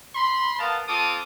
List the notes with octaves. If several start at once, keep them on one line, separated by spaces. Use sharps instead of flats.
B5 C6
B3 A#4 D#5 F5 A5
C4 F4 A4 A5 D6 D#6